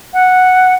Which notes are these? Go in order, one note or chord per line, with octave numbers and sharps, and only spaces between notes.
F#5